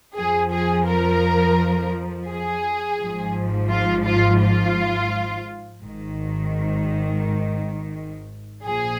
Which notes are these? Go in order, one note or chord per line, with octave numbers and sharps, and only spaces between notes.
F2 F3 G#4
G#4
A#4
G#4
G#1 G#2 F3
F4
F4
F4
G#1 G#2 D#3
A#1 A#2 F3 G#4